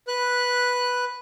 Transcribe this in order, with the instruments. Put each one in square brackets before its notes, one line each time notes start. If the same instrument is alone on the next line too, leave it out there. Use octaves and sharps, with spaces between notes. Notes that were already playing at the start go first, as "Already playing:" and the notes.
[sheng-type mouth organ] B4 F#6